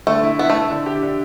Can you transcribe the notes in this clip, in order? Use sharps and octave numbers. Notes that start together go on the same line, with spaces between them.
D3 A3
E4
B3 E4
A3
E4
D3
G4
D3